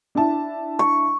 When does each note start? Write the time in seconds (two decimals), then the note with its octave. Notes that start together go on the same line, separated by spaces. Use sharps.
0.15 D4 E4 A5
0.79 C#6